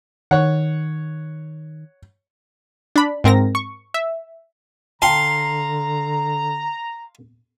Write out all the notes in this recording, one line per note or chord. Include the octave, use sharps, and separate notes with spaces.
D#3 C#5 F#5
D4 B5
G#2 C4 A#4 A#6
C#6
E5
D3 F5 G5 A5 A#5 C6